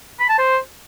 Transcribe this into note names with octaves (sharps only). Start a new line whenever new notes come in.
B5
A5
C5